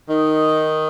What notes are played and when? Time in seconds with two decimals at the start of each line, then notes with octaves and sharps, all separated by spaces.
0.08 D#3 D#4